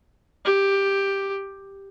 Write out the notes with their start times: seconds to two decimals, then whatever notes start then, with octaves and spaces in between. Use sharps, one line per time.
0.45 G4